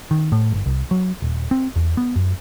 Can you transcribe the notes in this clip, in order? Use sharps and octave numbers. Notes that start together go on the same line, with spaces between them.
D#3
A2
G1
C2
F#3
D#1
C4
E2
B3
F#2